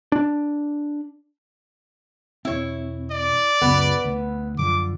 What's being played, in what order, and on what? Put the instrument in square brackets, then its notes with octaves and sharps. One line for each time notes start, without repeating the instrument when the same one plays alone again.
[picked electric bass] D4
[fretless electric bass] E1 C4 [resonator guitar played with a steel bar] E4 C#5
[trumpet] D5
[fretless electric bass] C#2 F#2 [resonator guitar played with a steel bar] B3 B4
[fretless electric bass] D2
[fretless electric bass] F#2 D3 F3 [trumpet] D6